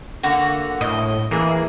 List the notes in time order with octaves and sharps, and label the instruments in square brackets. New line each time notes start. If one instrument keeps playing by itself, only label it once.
[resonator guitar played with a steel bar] D3 A#3 [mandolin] F#4
[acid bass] A2 [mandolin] D#5
[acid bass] E3 [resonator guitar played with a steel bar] A#3 G#4